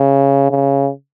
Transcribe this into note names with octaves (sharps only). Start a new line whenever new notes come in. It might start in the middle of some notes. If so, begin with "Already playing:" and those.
Already playing: C#3
C#3